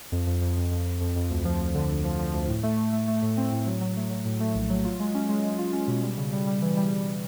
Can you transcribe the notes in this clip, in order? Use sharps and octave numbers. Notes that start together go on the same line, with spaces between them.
F2
F2
F2
F2
F2
F2
F2
F2
D2
F3
D2
D3
D2
F3
F3
D2
A2
A3
A3
A3
A3
A2
C4
A2
F#3
F#3
A3
F#3
A2
A3
A#1
F#3
F4
G#3
C#4
G#3
G#3
F4
C#4
B2
G3
C#3
G3
G3
E3
G3